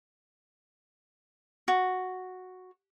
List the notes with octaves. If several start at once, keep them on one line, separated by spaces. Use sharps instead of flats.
F#4